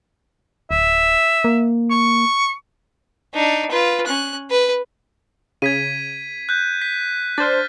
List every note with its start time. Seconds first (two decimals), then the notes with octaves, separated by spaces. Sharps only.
0.71 D1 E5
1.44 A#3
1.91 C#6
3.34 D4 D#4
3.71 F4 B4
4.07 C#4 F#6
4.50 B4
5.62 C#3 G#6 B6 D#7
6.49 F#6 G6
6.82 B6
7.38 D4 C5 F6 A6